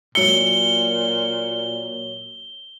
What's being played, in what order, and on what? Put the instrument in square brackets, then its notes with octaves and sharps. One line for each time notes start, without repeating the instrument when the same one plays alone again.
[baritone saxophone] A#2 [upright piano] F#3 C#7 [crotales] G7